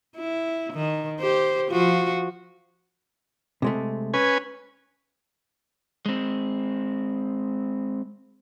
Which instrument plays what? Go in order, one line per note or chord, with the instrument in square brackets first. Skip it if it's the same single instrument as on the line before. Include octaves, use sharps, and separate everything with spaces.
[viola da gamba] E4
D#3
G4 C5
F3 F4 F#4
[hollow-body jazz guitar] C3 G#3 A3
[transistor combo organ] C#4 B4 G#5
[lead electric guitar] G#3 C4